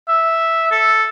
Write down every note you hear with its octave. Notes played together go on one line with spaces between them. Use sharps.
E5
A4